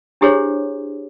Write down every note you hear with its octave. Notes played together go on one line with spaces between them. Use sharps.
D4 E4 G4 G#4 C5 C#5